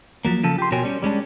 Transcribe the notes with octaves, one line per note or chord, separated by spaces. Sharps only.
F3 F#3 A#3
C#3 F3 A4
G4 C6
B2 F#4 A#4 C#5 G5 G#5
G3 C#4
G3 G#3 C#4 D4